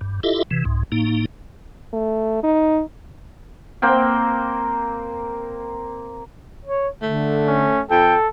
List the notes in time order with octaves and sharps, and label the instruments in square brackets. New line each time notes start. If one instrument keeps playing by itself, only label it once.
[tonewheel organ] G2
E4 F4 G4 A4 D#5 E5
C3 E3
C2 G#2
A2 A#3 D#4
[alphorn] A3
D#4
[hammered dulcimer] A#3 C4 G5
[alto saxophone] C#5
[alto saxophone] D3 [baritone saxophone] A3
[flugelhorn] C#4
[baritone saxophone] F2 [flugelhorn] A4 [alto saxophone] G5